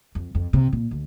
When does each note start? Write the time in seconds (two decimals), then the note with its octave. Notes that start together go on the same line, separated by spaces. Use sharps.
0.15 F2
0.35 F2
0.53 C3
0.73 A#2
0.91 D2